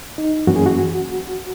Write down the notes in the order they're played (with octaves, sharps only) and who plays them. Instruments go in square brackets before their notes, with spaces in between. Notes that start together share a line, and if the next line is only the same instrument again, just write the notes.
[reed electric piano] D#4
F#2 E3 A#3 C#4 F#4
G#4
F#4